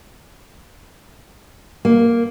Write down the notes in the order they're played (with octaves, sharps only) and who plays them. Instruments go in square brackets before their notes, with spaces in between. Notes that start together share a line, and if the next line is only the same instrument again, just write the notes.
[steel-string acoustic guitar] A#3